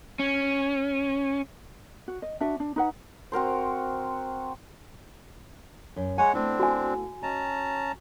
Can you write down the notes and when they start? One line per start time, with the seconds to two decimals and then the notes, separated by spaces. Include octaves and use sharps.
0.19 C#4
2.08 F#4
2.22 D#5
2.41 D4 F#4 E5
2.60 D4
2.76 D#4 B4 F#5
3.32 C4 F#4 A#4 C5
5.96 F#2
6.18 G#3 C#5 F#5 G#5
6.34 A3 B3 C4 D4 E4
6.60 F#4 G#5
7.23 C#4 D#5 A5 A#5